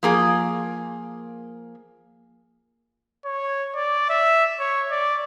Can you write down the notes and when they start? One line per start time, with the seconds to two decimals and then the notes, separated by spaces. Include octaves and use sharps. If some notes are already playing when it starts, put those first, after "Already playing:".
0.03 F3 A#3 G#4
3.25 C#5
3.75 D5
4.09 E5
4.59 C#5
4.91 D5